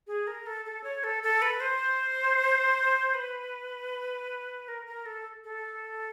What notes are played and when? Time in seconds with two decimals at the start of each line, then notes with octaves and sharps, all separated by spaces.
0.07 G#4
0.27 A#4
0.46 A4
0.65 A4
0.84 C#5
1.04 A4
1.23 A4
1.42 B4
1.60 C5
3.14 B4
4.68 A#4
4.86 A#4
5.06 A4
5.44 A4